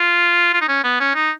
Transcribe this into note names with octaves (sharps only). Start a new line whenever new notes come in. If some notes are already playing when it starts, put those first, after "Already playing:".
Already playing: F4
F4
D#4
C#4
B3
C#4
D#4